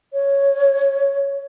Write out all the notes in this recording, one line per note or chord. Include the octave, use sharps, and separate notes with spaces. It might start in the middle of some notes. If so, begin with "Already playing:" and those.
C#5